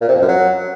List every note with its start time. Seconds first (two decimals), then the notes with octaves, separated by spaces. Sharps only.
0.01 A#2
0.08 C3
0.15 F2
0.21 F#2
0.28 F#3